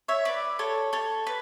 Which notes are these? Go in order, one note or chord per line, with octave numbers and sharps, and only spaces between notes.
C#5 E5
B4 D5
A4 C#5
A4 C#5
B4